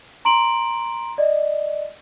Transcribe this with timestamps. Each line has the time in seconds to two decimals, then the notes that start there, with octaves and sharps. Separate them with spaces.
0.25 A#5 C6 D7 F#7
1.18 D5 D#5